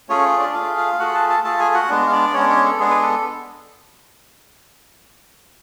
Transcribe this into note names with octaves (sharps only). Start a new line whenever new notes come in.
A3 C#4 F4 G#4 C#5
D4 D5
A3 F4 G#4 F5
F4 F5
A3 F4 F#4 G#4 F#5
A4 A5
A4 A5
A3 F4 G#4 A4 A5
G#4 G#5
F#4 F#5
G#3 B3 D4
F5
D4 D5
G#3 B3 C#4 D4 C#5
C#4 C#5
A4
G#3 B3 D4 G#4
B4
A4